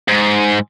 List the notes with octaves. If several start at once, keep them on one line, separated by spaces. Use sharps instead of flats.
G#2